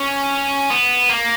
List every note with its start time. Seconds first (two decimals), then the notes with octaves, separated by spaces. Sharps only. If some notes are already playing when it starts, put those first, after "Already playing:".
Already playing: C#4
0.70 B3
1.09 A#3